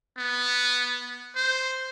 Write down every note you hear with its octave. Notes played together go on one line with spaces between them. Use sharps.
B3
C5